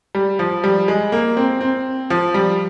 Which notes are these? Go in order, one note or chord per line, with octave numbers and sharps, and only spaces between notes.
G3
F3
G3
G#3
A#3
C4
C4
F3
G3